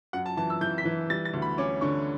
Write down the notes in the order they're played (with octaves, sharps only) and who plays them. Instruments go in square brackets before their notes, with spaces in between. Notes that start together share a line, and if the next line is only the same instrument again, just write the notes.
[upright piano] F#2 F#5
A5
E3 A5
E6
E3 G6
B6
E3
G3 A6
A6
D2
B5
C#4 D6
D3 C#6